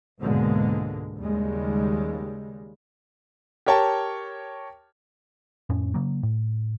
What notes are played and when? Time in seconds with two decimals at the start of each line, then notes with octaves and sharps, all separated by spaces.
0.20 C#2 G#2 B2 D3 G#3 A#3
1.18 D#2 C#3 G3 G#3
3.66 G4 A#4 C#5 G5 A5
5.70 F2 A2 C#4
5.94 C#3 F#3 A#3
6.23 A2